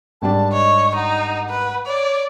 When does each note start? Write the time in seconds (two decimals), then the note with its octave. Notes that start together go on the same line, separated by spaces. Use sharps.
0.22 G#1 G3 D4 A5
0.53 C#5 D#5
0.95 D#4 F#5
1.50 B4
1.86 C#5 D5